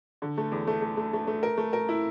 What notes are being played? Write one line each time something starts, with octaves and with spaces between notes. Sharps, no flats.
D3
A3
E2
A3
A3
A3
A3
A3
A#4
A3
A#4
E4